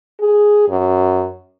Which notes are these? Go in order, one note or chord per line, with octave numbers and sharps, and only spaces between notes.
G#4
F#2